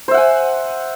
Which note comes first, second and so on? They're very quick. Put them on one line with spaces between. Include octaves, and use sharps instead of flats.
C5 E5 F#5 G#5